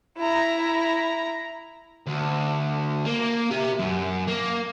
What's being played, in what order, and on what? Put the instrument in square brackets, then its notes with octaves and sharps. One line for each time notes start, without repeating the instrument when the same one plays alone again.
[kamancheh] E4 A#5
[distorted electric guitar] D2
A#3
G4 E5
F#2
A#3